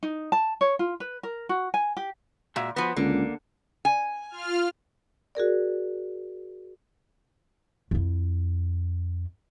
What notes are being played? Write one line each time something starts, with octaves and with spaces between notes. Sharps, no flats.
D#4
A5
C#5
F4
B4
A#4
F#4
G#5
G4
A#2 G#3 F#4 E5
F3 B3 F#4 B4
C#2 D3 A#3
G#5
F4 F6
F#4 G#4 A#4 D5
F2 E4